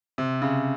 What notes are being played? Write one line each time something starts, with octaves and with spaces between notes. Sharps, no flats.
C3
C#3